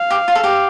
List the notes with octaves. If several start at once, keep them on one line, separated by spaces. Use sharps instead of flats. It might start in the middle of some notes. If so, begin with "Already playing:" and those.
Already playing: F5
G4
F4
A4
G4